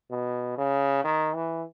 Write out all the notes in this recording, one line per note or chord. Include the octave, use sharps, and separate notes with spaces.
B2
C#3
D#3
E3